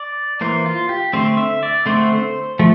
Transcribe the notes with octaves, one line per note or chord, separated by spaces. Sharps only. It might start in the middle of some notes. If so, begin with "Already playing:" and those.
Already playing: D5
E3 A#3 C5
F4
G4
D3 A3 C4 C5
E5
D5
D3 A3 C4 C5
F3 A3